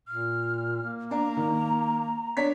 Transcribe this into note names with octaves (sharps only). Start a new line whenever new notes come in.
A#2 F6
A#3
D4 A#5
D#3
D4 C#5 B6